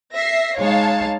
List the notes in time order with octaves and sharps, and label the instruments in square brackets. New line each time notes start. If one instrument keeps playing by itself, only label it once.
[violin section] E5 A#6 C7
[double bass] G#3 D#4 [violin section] C#5 F5 A5